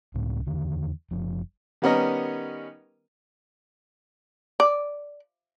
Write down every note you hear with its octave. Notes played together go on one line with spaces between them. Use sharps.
C#2 A2 G#3
E2 D3 D#3
F#1 F3
D#3 G3 B3 C#4 A#4 D#5
D5